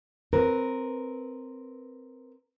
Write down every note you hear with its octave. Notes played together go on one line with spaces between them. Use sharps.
C4 A#4 B4